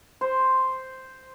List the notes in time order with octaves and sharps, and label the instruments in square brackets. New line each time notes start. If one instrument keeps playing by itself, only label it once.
[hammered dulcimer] C5